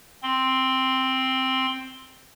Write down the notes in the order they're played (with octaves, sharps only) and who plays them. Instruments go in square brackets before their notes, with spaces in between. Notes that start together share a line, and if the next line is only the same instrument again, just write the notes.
[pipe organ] C4 C6